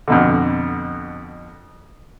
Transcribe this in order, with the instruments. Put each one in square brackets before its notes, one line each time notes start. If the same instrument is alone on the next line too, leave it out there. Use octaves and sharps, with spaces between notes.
[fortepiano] F2 B2 D3